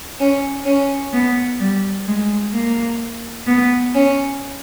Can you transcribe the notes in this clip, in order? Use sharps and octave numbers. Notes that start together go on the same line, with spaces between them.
C#4
C#4
B3
G3
G#3
A#3
B3
C#4